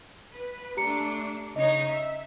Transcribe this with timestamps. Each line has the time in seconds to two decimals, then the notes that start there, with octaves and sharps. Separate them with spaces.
0.33 B4
0.77 A3 D4 G4 A#5 C#7
1.56 C#3 D#4 C#5 D#5
1.87 E5